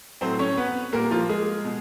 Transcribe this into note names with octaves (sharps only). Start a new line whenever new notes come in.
A2 F#3 A3 C4 C5
C#4 C#5
B3 B4
A#2 G3 A#3 A#4
F3 F4
G#3 G#4
B2